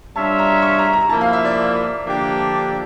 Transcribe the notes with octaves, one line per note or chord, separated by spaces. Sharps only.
G3 D4 F4 C#5 E5 A5
A#5
C#6
A#5
A#5
F3 A#3 E4 A5
F5
E5
D5
D3 F3 A#3 D4 G4